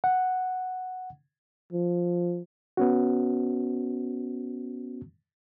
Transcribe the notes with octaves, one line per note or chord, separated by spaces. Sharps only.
F#5
F3
B3 C#4 F#4